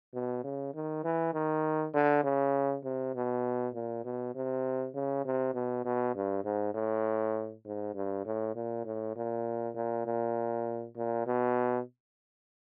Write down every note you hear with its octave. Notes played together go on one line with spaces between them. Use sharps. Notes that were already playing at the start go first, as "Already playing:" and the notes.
B2
C#3
D#3
E3
D#3
D3
C#3
C3
B2
A#2
B2
C3
C#3
C3
B2
B2
G2
G#2
A2
G#2
G2
A2
A#2
A2
A#2
A#2
A#2
A#2
B2